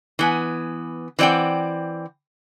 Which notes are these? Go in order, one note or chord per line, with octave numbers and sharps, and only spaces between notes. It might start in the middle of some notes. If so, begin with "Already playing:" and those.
E3 B3 G#5
E3 C4 D5 F#5 G5